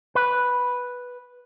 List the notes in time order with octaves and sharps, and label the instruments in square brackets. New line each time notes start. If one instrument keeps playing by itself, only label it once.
[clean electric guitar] B4